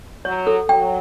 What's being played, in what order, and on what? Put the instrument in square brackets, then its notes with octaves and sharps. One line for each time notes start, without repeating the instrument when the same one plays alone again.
[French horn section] F#3 [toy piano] C#5
[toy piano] A4
[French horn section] F#3 [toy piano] G5